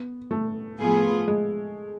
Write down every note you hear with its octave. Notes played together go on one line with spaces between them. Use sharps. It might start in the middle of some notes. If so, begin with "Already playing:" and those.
Already playing: B3
A3
A2 F3 B3 F4 G#4
G#3